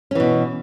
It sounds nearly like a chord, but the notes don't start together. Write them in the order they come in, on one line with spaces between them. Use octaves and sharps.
C#4 E3 B2